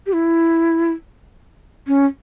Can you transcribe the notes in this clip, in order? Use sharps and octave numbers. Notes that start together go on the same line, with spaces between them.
G4
E4
C#4